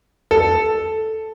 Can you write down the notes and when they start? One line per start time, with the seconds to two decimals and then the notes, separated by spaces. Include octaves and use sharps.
0.31 A4